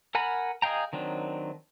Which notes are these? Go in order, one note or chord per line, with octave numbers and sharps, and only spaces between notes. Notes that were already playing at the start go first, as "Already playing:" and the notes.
A#4 F#5 G#5 A#5 B5
G#4 D#5 F5 G5 A#5
D#3 F#3 C4 D4